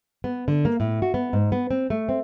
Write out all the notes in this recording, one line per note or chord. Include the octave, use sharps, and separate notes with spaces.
B3
D3
A#3
A2
F#4
B3
G#2
B3
C4
A3
C4